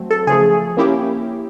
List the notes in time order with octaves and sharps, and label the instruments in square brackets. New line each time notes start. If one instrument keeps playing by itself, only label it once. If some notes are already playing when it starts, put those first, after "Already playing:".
Already playing: [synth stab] F#3 A3 C4
[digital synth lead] A4
[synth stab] C#3 F3 A3 [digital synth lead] G#4
[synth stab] A#3 C#4 E4 G4